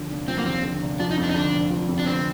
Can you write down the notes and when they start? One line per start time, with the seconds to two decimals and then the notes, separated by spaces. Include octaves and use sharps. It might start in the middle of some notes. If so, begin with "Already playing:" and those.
Already playing: D#2 D3 F3
0.11 F1
0.28 F3 C4
0.37 A#3
0.46 D#2 C4
0.63 D3
0.81 F1
0.99 F3 D4
1.11 D#4
1.17 F2
1.23 D4
1.29 D#4
1.35 D3 D4
1.53 F1
1.70 F3
1.89 F2
1.99 D4
2.06 D3 C4